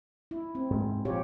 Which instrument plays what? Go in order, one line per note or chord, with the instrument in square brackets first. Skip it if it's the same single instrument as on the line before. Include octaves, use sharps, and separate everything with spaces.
[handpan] E4
C4
[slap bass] G#2
[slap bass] A#2 F3 [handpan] G4 C#5